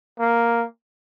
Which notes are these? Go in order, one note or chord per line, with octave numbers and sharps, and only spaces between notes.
A#3